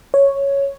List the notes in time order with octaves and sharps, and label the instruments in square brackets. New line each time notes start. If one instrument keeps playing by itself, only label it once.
[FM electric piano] C#5